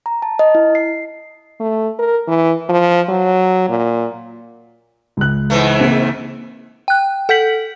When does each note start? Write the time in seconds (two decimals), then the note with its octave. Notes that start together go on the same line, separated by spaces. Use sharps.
0.06 A#5
0.22 A5
0.39 D#5
0.55 E4
0.75 C7
1.60 A3
1.99 A#4
2.28 E3
2.69 F3
3.08 F#3
3.69 A#2
5.17 C#2 F#6
5.50 G#2 E3 A3
5.80 C#3 A#3 C4
6.88 G5 F#6
7.29 A4 F#5 G6 B6 F#7